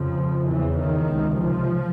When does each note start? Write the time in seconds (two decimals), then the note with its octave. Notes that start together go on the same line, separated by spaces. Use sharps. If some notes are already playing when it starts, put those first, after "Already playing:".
Already playing: F2 C#3 F3
0.46 E2 C#3 E3
0.77 D#3
1.07 C#2 C3
1.38 F3